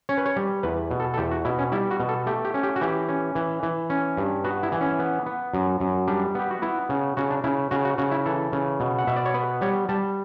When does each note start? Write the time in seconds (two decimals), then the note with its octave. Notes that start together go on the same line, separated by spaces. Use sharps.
0.09 C#4 C#5
0.17 B4
0.26 C#5
0.36 G3
0.63 E2 B4
0.91 B2
1.00 A4
1.14 A4
1.18 E2 G4
1.31 F#4
1.45 B2 E4
1.59 C#4
1.72 G3 E4
1.91 F#4
2.00 B2
2.09 A4
2.26 A3 G4
2.45 G4
2.54 C#4
2.63 G4
2.76 F#4
2.81 E3 G4
3.09 C#4
3.35 E3
3.63 E3
3.90 C#4
4.17 G2
4.44 B3 F#4
4.63 E4
4.72 E3
4.81 C#4
4.99 B3
5.26 B3
5.54 F#2
5.80 F#2
6.07 G3 D4
6.35 B3 G4
6.51 F#4
6.62 B3 E4
6.89 C#3
7.17 C#3 F#4
7.30 D4
7.44 C#3 E4
7.71 C#3 F#4
7.85 F#4
7.98 C#3 F#4
8.11 E4
8.26 E3 A4
8.53 C#3
8.80 B2
8.98 F#5
9.07 B2 E5
9.16 D5
9.26 C#5
9.34 B3 B4
9.61 G3 C#5
9.89 G3 A5